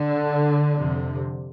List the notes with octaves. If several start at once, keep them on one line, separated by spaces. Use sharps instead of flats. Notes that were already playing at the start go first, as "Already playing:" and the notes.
Already playing: D3
F2 C3